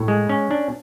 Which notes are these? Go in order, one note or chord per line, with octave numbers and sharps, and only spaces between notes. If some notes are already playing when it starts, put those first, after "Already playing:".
Already playing: A2
G#3
C#4
D4